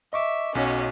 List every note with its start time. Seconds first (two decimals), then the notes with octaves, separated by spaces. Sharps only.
0.13 D#5 E5 C#6 D6
0.55 B1 F#3 C#4 F#4